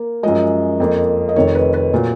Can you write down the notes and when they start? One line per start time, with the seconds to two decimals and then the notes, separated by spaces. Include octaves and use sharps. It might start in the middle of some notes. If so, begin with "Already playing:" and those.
Already playing: A#3
0.23 F#2 F3 G#3 D#5
0.80 F2 F3 A#3
1.29 D#5
1.36 F1 F2 D#3 C#5
1.55 B4
1.74 B4
1.94 A#2 F#3